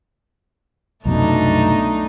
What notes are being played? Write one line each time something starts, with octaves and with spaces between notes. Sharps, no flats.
C2 F#2 B2 A3 D4 D#4